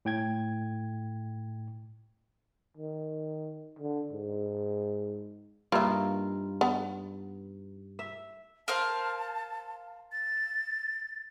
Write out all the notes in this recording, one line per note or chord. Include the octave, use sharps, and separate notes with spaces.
A2 G5 G#6
D#3
D3
G#2
G2 A#3 D#4 F4 E5
B3
E5
A#4 C5 F5 A5
A6